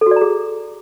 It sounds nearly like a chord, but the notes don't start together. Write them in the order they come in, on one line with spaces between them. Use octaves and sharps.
A4 F#4 D5 A#5 G#4